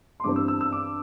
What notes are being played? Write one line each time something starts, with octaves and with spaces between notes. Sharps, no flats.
C6
G2 E3 G3 C4 D6
E6
E6
E6
D6